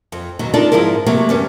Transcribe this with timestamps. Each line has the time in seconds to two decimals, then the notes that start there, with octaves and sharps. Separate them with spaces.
0.12 F2
0.39 D#2 B2 F#3
0.54 D4 D#4 F4 A4 A#4 D5
0.72 G#2 F3 E4 G#4 A#4
1.06 C3 F#3 A3 A#3
1.29 E2 G2 C#4